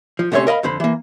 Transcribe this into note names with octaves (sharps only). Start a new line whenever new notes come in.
F3
D2 C3 A3 C#4 C#5 C6
A#4 D#5 F5 B5
F2 D3 C5 B5
E3 A#3